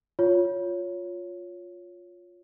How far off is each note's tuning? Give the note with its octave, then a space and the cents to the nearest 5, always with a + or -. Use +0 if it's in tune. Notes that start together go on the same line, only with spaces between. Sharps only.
F4 +10 C#5 +10